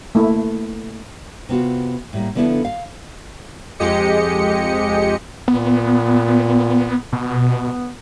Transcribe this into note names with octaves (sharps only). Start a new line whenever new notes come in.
A3 A#3 E4
C3 B3 F4 F#4
A2 G3 A#3
D3 F3 B3 D4 E4 A4
F5
F2 G#3 G4 D#5 C#7
A#2 B3
B2 B3